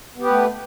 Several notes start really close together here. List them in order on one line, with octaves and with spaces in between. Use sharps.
B3 G4 B4 A3